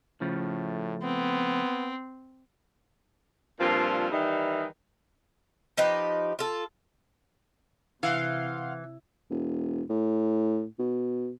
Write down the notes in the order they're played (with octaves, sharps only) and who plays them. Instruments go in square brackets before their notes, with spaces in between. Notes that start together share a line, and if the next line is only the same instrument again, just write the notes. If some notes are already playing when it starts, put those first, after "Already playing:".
[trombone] A2 [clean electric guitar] C#3 F3 A3
[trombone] B3 [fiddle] C4
[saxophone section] G2 A#2 F3 C4 F4
D#3 E3 G3 D#4
[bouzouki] F3 D#4 G4 B4
F4 A4
[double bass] C3 [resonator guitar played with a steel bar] E3 [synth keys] F5 F#5 C6
[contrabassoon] E1
A2
B2